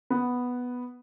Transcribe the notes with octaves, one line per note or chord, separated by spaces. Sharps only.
B3